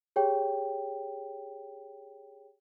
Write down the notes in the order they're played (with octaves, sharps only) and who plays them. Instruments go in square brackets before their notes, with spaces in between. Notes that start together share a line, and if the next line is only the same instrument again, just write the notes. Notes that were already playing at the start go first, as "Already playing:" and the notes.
[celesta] G4 G#4 C#5 G5